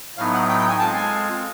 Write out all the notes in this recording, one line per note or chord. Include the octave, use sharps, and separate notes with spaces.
A2 F#3 B3 D#4 F5
F#5
G5
G5
G#5
G#3 C4 F4 A4 A5
G#5